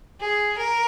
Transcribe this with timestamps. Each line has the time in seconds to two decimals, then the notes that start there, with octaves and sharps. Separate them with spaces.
0.20 G#4
0.57 A#4